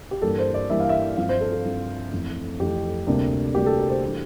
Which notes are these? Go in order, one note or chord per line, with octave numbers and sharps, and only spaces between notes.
G4
G2 E3 G3 A#3 A4
C5
D5
G2 E3 G3 A#3 E5
F5
E5
G2 F3 C4 F5
C5
A4
A4
G2 F3 C4
F2 E3 A3 C4
F2 E3 A3 C4 G4
D2 C3 G3 A#3 D4
D2 C3 G3 A#3 D4 G4
A4
A#4
C5
E3 G3 D4